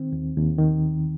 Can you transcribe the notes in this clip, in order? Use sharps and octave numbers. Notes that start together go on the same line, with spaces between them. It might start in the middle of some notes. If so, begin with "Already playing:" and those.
Already playing: D#3 C4
D#2
D#2
D#3